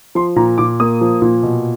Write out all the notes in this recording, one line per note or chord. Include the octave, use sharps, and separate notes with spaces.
F3 C6
A#2 A#5
A#2 D6
A#3 D#6
F3
A#2
B2